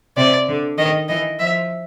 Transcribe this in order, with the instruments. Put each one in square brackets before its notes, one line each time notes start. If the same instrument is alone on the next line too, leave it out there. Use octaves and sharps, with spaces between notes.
[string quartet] C3 [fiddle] D5
[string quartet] D3
[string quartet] D#3 [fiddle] D#5
[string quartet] E3 [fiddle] D#5
[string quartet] F3 [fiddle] E5